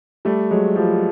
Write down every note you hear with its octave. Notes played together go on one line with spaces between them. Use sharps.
G3 A3
F#3 G#3
F3 G3